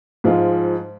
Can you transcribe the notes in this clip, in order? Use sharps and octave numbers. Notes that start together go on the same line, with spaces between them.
G#2 F3 G#3 F4